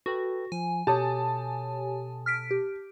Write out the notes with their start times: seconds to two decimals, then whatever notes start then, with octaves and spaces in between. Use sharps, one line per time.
0.06 F#4 A4 B4 G5
0.52 F3 G#5
0.87 B2 G4 A4 C#5 A5 D#6
2.26 F6 B6 D7
2.51 G4